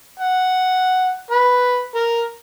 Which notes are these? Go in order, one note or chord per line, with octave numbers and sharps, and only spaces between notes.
F#5
B4
A#4